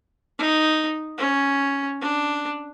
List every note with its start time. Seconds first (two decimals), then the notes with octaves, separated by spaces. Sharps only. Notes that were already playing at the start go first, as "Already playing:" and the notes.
0.39 D#4
1.17 C#4
2.01 D4